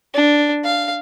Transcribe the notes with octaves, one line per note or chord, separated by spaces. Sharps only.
D4
F5